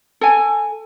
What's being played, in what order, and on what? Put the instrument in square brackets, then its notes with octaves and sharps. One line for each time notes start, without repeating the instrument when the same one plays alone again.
[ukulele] A4 G#5